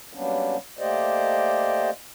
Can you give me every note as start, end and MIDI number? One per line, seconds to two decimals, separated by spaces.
0.13 0.57 54
0.13 0.57 55
0.13 0.57 58
0.13 0.57 59
0.13 0.57 61
0.13 0.57 62
0.79 1.90 57
0.79 1.90 58
0.79 1.90 67
0.79 1.90 72
0.79 1.90 74
0.79 1.90 75